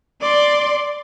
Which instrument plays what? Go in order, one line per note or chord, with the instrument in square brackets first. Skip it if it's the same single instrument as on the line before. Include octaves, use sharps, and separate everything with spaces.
[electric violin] D5 C6